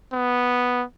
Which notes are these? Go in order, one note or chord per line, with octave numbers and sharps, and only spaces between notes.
B3